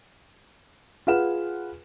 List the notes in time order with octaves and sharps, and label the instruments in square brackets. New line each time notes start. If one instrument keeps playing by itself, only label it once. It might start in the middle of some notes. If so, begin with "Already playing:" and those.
[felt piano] F4 G#4 B4 F#5 E7